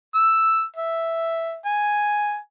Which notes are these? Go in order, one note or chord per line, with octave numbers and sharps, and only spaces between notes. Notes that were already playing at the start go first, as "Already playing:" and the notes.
E6
E5
G#5